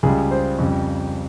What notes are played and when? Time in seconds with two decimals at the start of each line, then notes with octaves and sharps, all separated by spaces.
0.03 C#2 C#3 G3 G#4
0.31 C5
0.58 F2 C#3 G3